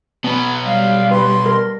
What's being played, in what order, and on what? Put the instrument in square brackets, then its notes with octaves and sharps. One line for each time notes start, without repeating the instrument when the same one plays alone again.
[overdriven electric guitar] B2 F#3 [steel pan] B3 [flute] B5
[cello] G3 [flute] F5
[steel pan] G4 B4 [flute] C6
[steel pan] A#4